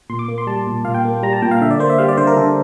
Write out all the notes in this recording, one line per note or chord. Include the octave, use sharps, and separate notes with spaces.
A#2 C6
D6
A#3
C6
G3 A5
A#2
A#2 F5
G5
A#3
G3 A#5
A5
A#2 G5
F5
D3 E5
D5
A#3 C5
E5
G3 F5
D5
D3 C5
A#4
D3 A4